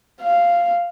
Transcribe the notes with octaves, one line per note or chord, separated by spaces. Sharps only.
F5